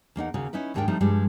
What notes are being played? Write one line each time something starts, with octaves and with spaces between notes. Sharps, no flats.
E2 A#3 D#4 F#5
D#2 C#3 A#3 F#4
C#4 D#4 E4 B4
D#2 G#2 G#3 D4 A#4 G5
F3 G3 A3 C4 D#4
G2 F3 G3 G#3